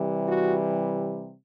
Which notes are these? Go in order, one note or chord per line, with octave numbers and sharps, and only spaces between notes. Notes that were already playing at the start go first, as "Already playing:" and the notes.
Already playing: C3 E3 G3
F#4